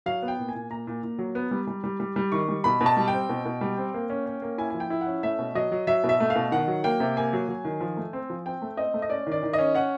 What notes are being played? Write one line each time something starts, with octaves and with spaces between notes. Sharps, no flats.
F#3 F5
B3
G5
A#2
G#5
A#2
A#2 A#5
A#2
A#2
F#3
B3
G3
G3
G3
G3
G3
D#3 C#6
G3
B2 B5
B2
A5
G3
C4 G5
B2
B2
G3
C4
A#3
C#4
C#4
A#3
E4 G#5
F3 G#5
G5
E4
F#5
C#4
A3 E5
B2
F#3 D#5
F#3
F#3 E5
B2
E5
A3
F5
B2
D#3 F#5
F#3
A#3 G5
C3
A#3 G#5
F#3
F#3
D#3
F3
A3
C4
F3
C4 G5
A3
C4 D#5
A3
D#5
C#4 D5
D#3
D5
D#3
C#4 D#5
C#4 F#5